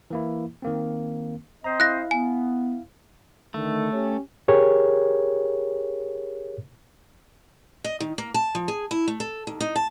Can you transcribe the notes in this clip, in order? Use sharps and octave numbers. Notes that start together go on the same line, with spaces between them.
E3 A#3 E4
D#3 A#3 C4
C4 C5 D#5 A#5
E4 F5 F#6 A#6
B3 G#5
D3 D#3 A3
C#4 G4
G4 G#4 A#4 C#5
D#5
D#3
A#3
A5
F3
G#4
E4
A3
A4
D#2
D#4
A5